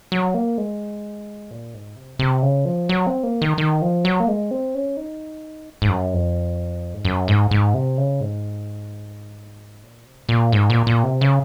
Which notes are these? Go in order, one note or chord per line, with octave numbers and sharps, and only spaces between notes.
F#3
A#3
G#3
A#2
G#2
C3
C3
C#3
F3
F#3
C4
A#3
D#3
D#3
F3
F#3
A#3
G#3
C4
C#4
D#4
G#2
F#2
F2
G#2
F#2
G#2
G#2
C3
C#3
G#2
A#2
C3
G#2
A#2
G#2
A#2
A#2
C3
C#3